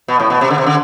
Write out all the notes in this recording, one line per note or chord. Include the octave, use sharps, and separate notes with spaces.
B2
A2
B2
C3
D3
C3
D3